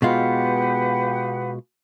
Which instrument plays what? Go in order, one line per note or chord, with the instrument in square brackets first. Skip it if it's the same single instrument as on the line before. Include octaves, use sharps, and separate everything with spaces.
[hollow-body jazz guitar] B2 G#3 F4 [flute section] G4 B4 F#5